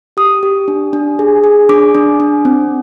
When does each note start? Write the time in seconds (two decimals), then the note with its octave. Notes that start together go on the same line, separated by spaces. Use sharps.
0.17 G4 D#6
0.43 G4
0.68 D4
0.93 D4
1.19 G#4
1.44 G#4
1.69 D4 D6
1.95 D4
2.20 D4
2.45 C4